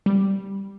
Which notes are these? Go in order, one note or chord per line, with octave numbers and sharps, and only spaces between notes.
G3